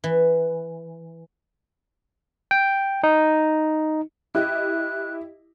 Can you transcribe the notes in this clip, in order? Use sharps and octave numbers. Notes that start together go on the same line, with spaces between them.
E3
G5
D#4
E4 G4 D#5 F#6